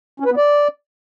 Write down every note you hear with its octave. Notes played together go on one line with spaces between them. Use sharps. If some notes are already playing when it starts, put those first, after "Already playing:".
C#4
B4
B3
D5